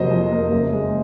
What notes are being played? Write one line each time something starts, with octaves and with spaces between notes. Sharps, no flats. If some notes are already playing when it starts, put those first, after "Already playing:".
Already playing: F2 C3 F#3 A#3 C5 D#5
F2
A#3
F#1
G#3